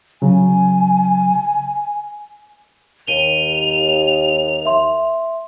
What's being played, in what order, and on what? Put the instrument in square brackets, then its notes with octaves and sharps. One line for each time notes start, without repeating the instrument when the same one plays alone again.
[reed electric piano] C#3 F#3 [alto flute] G#5
[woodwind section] D#2 [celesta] D#7 G7 [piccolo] F7
[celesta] E5 C6